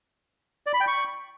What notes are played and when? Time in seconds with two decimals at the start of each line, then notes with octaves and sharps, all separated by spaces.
0.67 D5
0.74 B5
0.80 G5
0.87 C#6